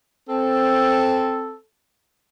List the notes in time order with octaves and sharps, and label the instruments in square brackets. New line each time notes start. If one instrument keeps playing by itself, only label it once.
[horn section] C4 A4